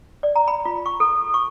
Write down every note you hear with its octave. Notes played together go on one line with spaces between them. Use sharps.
D5
A#5
B5
F4
C#6
A4
C#6